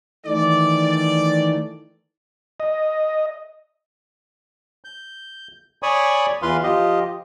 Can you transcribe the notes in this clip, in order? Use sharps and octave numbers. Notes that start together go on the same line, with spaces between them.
D#3 E3 A3 D5
D#5
G6
C#5 D5 G#5 B5 C#6 D#6
E2 E3 F4 B4 F5 C6
F3 F4 G4 D#5